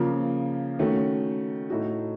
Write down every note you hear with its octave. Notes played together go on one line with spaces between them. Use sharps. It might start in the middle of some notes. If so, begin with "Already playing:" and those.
Already playing: C#3 F3 A#3
D#3 A3 C#4 F#4
A2 A3 D#4 F#4